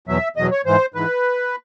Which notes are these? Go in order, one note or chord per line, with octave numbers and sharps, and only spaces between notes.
E2 B2 F#3 E5
E2 B2 F#3 D#5
C#5
G#2 E3 C5
G#2 E3 B4